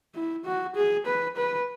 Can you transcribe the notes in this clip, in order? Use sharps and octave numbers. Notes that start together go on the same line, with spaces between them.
E4
F#4
G#4
B4
B4